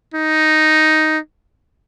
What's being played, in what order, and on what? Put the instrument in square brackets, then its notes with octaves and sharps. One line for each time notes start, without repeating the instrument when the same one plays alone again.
[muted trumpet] D#4